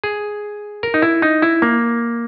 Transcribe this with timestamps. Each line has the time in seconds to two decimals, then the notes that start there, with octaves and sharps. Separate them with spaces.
0.04 G#4
0.83 A#4
0.94 D#4
1.02 E4
1.22 D#4
1.42 E4
1.62 A#3